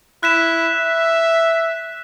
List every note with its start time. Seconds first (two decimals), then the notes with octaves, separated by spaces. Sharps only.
0.23 E4 F#6 B6 E7
0.75 E5